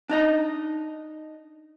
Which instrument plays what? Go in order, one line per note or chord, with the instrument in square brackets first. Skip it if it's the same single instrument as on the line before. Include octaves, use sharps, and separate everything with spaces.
[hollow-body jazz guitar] D4 D#4 D#5